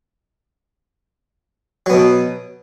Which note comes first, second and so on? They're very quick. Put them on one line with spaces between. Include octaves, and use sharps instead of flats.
F#3 B3 B2